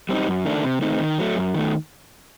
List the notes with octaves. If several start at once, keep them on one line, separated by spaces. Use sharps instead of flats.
G3 C4 D#4
F#2
D#3 A3 D4
C3
D#3 A3 C4 D#4
D#3
F#3 A3
F#2
D#3 A3